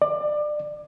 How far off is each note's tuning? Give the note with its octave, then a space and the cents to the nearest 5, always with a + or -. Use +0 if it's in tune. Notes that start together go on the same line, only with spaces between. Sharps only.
D5 +25